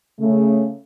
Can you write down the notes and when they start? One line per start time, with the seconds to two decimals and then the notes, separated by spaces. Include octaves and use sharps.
0.19 C#3 A3